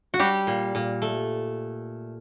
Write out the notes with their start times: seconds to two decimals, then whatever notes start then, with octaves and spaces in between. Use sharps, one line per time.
0.14 F#4
0.19 G3 G4
0.47 A#2
0.75 A#2
1.02 A3